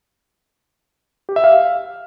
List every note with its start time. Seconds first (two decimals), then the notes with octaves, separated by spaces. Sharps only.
1.29 G4
1.36 E5
1.44 F5